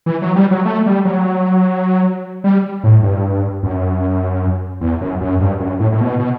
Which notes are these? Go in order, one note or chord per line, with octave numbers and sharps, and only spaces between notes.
E3
F#3
G3
F#3
A3
G3
F#3
G3
A2
G2
F#2
E2
F#2
F#2
G2
F#2
A2
A2
B2
B2